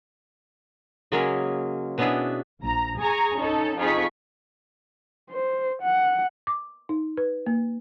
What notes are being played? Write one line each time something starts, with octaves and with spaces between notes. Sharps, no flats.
C#3 F#3 G#3 A#3 C#4 G#4
B2 B3 C#4 D4 E4 G#4
A#1 A#5
G#4 G#5 A#5 C#6
C#4 D#4 A4
F2 D#4 F4 G#4 C#6 B6
C5
F#5
D6
D#4
B4
A#3